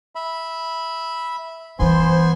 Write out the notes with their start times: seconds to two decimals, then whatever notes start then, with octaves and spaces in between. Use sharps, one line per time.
0.15 E5 B5
1.79 G2 E3 B3 C5 G#5 C6